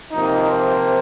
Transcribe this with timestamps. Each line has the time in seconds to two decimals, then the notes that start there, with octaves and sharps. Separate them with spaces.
0.12 C3 F3 A#3 D#4
0.50 C5